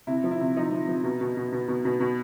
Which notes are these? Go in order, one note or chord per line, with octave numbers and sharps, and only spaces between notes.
C3 E4
F3
E4
C3
F3 D#4
F3
F3
B2
B2
B2
B2
B2
B2
B2